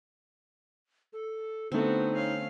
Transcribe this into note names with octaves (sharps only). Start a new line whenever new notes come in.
A4
D3 A3 B3 C4 D#4 F#4
C#4 F5